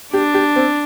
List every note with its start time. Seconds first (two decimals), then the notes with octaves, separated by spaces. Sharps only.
0.13 D4 G4
0.34 G4
0.56 C4